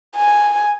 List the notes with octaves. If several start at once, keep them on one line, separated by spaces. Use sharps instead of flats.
G#5